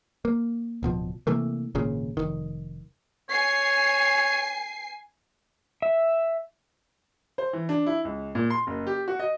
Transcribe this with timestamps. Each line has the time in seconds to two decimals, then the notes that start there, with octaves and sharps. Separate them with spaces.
0.25 A#3
0.83 D1 B2 F3
1.27 C3 E3 A3 A#3
1.75 G#1 A#2 C#3
2.17 F1 B1 D#3
3.30 C#5 G#5 C7
5.82 E5
7.38 C5
7.53 E3
7.69 D4
7.86 E4
8.05 C#2
8.35 A#2
8.50 C6
8.67 F#1
8.87 G4
9.08 F#4
9.19 D#5